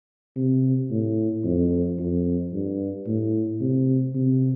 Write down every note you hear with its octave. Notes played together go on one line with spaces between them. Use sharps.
C3
A2
F2
F2
G2
A2
C3
C3